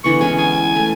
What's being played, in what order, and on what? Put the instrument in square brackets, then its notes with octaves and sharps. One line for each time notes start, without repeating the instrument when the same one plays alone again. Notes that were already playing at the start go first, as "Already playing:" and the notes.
[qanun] D3 E3 B3 [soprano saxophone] C#6
[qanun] G#3 C#4 G#4 [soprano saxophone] G#5
[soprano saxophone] G#5
[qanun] A3